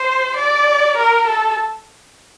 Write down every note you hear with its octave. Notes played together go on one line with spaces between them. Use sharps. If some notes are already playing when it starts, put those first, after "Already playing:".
Already playing: C5
D5
A#4
A4